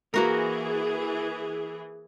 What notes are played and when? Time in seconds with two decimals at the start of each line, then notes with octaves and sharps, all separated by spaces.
0.14 E3 A#3 F#4 G#4 A#4